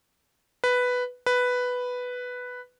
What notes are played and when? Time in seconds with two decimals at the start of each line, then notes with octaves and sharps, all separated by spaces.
0.64 B4
1.26 B4